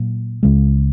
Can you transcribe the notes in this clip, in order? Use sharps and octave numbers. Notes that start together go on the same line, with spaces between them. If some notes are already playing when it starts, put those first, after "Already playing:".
Already playing: A#2 F#3 A#3
C#2 C#3 G#3